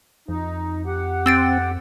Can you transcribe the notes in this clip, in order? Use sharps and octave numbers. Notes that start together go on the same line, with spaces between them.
F2 D#4
G4 F#5
C4 E6 A6 D7